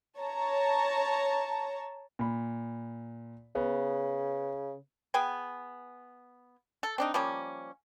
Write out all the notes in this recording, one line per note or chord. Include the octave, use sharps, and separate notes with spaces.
C#5 A5 A#5
A#2 B5
C#3 B3
B3 G#4 G5 G#5
A4
C4 D4 D#4
F3 G3 A#3 C#4